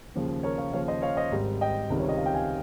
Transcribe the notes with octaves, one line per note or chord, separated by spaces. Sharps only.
D#2 C#3 F3
A#4 C#5
C#5 F5
D#2 C#3 F3 C#5 F5
C5 D#5
C#5 F5
C5 D#5
G#1 G#2 G3
D#5 G5
C#2 C3 D#3 G3
C#5
D#5
F5
G5
F5 G#5